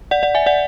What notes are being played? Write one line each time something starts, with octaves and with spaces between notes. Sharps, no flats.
D5 F#5
D5 F#5
E5 G#5
D5 F#5